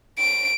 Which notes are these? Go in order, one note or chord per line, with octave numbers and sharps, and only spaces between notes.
D7